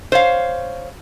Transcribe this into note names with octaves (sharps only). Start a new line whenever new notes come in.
C5 C#5 F5